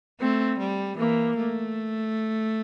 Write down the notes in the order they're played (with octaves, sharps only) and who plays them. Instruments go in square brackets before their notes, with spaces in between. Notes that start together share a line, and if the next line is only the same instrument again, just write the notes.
[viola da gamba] A3 [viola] C4
[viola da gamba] G3
[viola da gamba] E3 [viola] A#3
[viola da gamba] A3